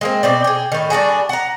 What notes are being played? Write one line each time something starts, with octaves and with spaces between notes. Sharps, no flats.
G#3 A#3 C4
B2 C4 D5
G#4 G5
A2 D#3
G3 D4 F#4 G#4
F#5 A#5